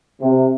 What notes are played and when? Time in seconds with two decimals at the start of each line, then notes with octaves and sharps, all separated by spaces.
0.22 C3